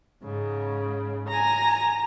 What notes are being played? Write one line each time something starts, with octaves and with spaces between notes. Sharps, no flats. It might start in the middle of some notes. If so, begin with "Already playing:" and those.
G#2 C#3
G#5 A#5 A#6